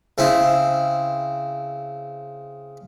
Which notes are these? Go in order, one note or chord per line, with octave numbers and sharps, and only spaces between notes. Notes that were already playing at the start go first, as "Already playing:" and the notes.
C#3 C4 E4